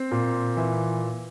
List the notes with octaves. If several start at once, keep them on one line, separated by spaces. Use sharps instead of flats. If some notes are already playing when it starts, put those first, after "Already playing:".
Already playing: C4
A#2
E3